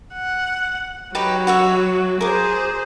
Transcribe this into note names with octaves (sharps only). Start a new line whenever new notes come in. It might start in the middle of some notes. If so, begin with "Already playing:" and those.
F#5
F#3 D#4 G4 B4
F#4 C#5 E5
G#4 A#4 C5 D6